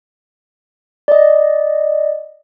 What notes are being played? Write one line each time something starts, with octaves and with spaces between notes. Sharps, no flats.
D5 D#5